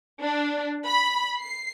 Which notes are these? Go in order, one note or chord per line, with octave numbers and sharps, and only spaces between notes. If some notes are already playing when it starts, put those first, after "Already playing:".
D4
B5
C7